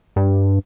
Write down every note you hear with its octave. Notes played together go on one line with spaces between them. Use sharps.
G2